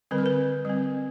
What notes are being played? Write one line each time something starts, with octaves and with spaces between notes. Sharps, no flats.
D3 G3 C4 B4
A#4
B4
G3 C4